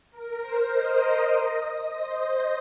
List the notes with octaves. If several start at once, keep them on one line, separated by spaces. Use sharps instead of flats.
A#4
C5
D#5
C5